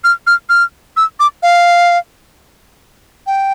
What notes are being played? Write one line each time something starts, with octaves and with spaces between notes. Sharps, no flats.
F6
F6
F6
E6
D6
F5
G5